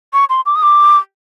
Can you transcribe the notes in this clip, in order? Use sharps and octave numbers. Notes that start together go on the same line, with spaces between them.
C#6
C6
D6
D#6
D6